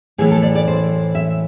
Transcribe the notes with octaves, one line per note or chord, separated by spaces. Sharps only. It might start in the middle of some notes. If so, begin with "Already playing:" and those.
A2 E3 A3 G#4
A4
D5
D5
C5
E5